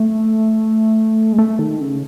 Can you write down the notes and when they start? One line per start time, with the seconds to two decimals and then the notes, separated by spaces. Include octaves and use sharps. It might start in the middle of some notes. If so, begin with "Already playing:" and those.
Already playing: A3
1.33 G#3
1.38 A3
1.59 D#3
1.81 C#3